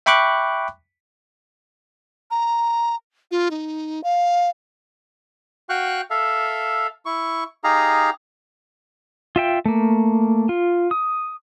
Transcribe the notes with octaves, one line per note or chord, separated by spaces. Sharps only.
E5 G5 B5 C#6 D6 F#6
A#5
F4
D#4
F5
F#4 F5 G5 C#6 F#6
A4 E5 F5
E4 C#6
D#4 G4 G#4 F5 A#5
F4 E5 G5
A3 A#3
F4
D#6